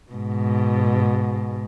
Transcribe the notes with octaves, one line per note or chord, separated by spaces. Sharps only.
G#2 B2